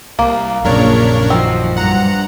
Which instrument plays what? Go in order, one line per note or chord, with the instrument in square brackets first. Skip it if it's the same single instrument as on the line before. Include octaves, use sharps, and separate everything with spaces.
[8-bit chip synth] C2 [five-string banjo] A#3
[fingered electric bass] A#1 F#2 [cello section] A#2 C#3 [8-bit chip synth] D4 A#4 C#5
[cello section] D#3 F3 F#4 [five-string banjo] C4
[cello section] G2 [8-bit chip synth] F#5 A#5